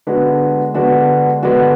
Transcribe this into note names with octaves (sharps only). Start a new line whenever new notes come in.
D3 G#3 B3 D4 F#4
D3 G#3 B3 D4 F#4
D3 G#3 B3 D4 F#4